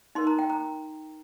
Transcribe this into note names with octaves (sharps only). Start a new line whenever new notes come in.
D#4 A#4 C6
A#5
G5
A#5